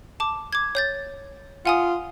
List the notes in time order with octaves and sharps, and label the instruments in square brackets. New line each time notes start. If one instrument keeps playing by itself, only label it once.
[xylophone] A5 D6
D6 G#6
C#5 G6 A6
[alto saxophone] F4 [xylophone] F#5 G#5 D#6